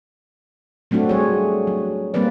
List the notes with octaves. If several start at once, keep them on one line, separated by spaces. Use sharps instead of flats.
F#3 A3 C4 D4 F#4
G3 G#4 C#5
F#3
G3 A#3 C4 B4 D5